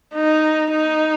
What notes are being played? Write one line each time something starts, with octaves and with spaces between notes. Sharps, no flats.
D#4
D#4